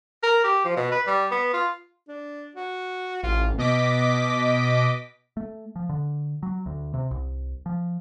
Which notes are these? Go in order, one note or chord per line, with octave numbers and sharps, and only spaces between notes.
A#4
G4
F3
B2
B4
G3
B3
F4
D4
F#4
A1 F4
B2 D#5 D6 B6
A3
F3
D3
F#3
D2
C3
C2
F3